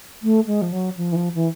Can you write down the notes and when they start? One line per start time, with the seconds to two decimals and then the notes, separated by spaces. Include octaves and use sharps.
0.23 A3
0.47 G#3
0.62 F3
0.72 F#3
0.97 F3
1.12 E3
1.16 F3
1.35 E3